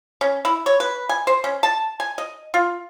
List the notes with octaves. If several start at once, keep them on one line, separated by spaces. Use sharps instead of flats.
C#4
E4
C#5
B4
G#5
C5
C#4
A5
G#5
D#5
F4